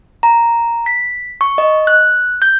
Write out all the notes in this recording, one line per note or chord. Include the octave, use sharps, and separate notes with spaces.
A#5
B6
C#6
D#5
F#6
G6